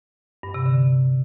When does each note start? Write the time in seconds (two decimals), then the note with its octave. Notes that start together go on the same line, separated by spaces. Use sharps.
0.43 G2
0.54 C3
0.66 D3